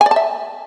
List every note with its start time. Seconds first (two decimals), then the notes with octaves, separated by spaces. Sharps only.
0.01 G#5
0.06 D5
0.11 A5
0.16 E5